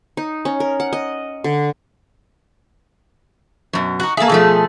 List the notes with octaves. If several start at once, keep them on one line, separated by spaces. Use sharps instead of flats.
D#4
C#4
A#4
F#5
D#5
D3
F#2 B2
D#4 F#4
A#3 G#4 A4 E5
B2 F3 A3